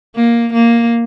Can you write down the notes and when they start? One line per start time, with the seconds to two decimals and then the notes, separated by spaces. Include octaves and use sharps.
0.15 A#3
0.53 A#3